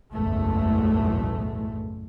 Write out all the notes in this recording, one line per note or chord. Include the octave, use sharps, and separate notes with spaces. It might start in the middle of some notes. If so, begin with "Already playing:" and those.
F#1 B1 E2 A2 G#3 A3